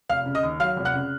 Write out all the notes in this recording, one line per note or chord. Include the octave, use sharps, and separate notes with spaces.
F1 F5 F6
C#3
D#5 D#6
D#2
F#3 F5 F6
F1
F#5 F#6
C#3